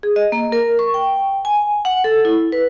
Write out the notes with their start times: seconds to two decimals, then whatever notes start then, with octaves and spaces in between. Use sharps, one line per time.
0.03 G#4
0.16 D#5
0.32 A#3
0.52 A#4
0.79 C#6
0.94 G5
1.45 G#5
1.85 F#5
2.04 A4
2.25 E4
2.52 B4